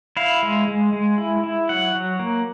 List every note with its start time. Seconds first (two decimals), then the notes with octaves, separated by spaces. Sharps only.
0.17 E4 F5
0.43 G#3
0.68 G#3
0.93 G#3
1.18 E4
1.44 E4
1.69 F#3 F#5
1.95 F#3
2.19 A#3